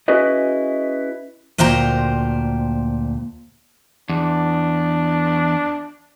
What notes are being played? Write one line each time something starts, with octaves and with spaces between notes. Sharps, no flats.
C#4 E4 F#4 G#4 B4 D#5
D2 A#2 C5 G5 A#5
E2 D4